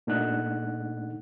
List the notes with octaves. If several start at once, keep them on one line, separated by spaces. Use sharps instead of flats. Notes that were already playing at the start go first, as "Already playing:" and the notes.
A#2 A3 D4 D#4 F#5 F#6